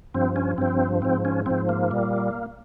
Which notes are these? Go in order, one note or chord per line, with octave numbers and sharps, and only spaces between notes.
G2 F3 C4
C#4
G2 F3 C4
G#2 F3 C4
C#4
G#2 F3 C4
A#3
A#2 G3